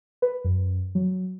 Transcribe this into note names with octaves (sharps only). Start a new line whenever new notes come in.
B4
F#2
F#3